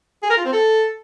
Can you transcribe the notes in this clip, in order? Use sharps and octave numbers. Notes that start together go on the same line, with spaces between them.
G#4
A#4
F4
C4
A4